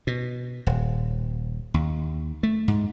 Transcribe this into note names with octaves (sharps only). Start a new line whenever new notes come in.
B2
D#1
D#2
A3
G#2